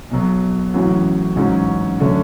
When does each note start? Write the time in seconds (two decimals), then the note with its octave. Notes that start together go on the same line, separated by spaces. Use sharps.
0.11 B1 B2 F#3
0.74 A1 A2 F#3 C#4 F#4
1.36 A1 G#2 F#3 C#4
2.00 D3 F#3 A3 C#4